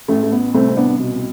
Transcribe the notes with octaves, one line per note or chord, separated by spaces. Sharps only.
A1 A3
A3
B3
C2 A3 C4
C4
B3 D4
B2